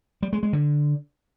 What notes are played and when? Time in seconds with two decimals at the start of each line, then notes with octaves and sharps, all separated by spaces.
0.23 G3
0.33 G#3
0.43 G#3
0.53 D3